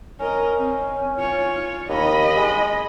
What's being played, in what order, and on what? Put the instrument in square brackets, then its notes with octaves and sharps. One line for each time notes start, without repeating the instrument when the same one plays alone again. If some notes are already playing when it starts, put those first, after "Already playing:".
[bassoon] C#4 [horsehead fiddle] A#4 D#5
[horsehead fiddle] C4
F4 C#5
[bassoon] D#2 [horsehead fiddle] D#5 B5
[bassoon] G#3